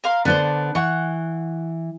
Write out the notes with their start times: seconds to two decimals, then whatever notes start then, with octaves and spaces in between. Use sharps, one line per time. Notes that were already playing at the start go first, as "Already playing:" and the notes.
0.04 A#4 F5 C6
0.25 D3 B3 D4 C5 A5
0.75 E3 F#5 C#6